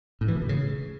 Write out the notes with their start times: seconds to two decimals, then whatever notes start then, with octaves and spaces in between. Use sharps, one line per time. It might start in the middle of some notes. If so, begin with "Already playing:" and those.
0.21 A2
0.28 E3
0.35 B2
0.42 A2
0.49 C#3